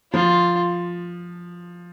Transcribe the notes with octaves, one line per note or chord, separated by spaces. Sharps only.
F3 F4